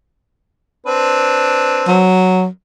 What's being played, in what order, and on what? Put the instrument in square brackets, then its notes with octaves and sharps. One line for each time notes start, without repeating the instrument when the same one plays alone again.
[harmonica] C4 D4 B4
[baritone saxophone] F#3